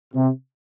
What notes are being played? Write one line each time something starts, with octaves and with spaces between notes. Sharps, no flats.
C3